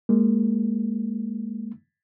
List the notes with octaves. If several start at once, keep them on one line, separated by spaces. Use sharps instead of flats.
G#3 A#3